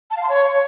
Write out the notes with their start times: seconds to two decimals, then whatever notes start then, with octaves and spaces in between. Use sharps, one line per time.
0.11 A5
0.17 F5
0.23 C6
0.29 C#5